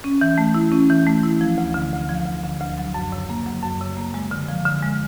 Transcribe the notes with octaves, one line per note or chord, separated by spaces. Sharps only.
C#4
E3
A3
E4
C#4
E3
A3
E4
F3
D2
D3
D2
F3
D2
D3
D2
F#3
F#2
C#3
A#3
F#3
F#2
C#3
A#3
G#3
D3
F3
D3
G#3